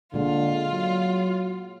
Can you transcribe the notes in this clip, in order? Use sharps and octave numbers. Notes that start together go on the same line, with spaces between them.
A#2 D3 G#3 F4
F#3